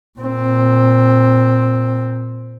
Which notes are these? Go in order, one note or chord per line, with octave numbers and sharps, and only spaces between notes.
A#2 C4